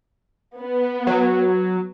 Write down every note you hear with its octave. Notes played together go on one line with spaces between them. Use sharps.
B3
F#3